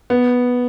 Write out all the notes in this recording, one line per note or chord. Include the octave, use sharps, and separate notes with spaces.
B3